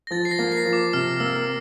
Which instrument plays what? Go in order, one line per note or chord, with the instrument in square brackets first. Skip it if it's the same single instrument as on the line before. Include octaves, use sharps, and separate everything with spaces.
[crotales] A#6
[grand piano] F3 [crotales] A6
[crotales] C7
A#6
[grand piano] A#3
[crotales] C7
[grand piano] F3
[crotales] D6
[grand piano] C3 [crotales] F6
[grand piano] A#3 [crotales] E6